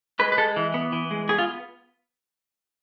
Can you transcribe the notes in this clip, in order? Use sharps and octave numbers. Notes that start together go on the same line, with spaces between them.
G#3 B4
B4
G#3 A4
E3
B3
E3
G#3
B3 G#4
F4